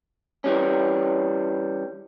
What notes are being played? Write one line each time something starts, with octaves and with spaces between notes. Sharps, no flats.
E3 G3 C#4